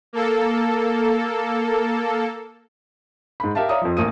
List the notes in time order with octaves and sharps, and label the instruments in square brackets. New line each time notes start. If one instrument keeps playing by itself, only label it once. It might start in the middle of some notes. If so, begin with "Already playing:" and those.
[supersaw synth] A#3 A4
[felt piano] G#2 B5
G4 A#4 E5 F5 A5
C#5 D5 E5 F5 A#5 D#6
F2 F3
A1 A#3 D#6 D#7